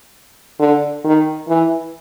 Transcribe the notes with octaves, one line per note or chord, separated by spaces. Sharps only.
D3
D#3
E3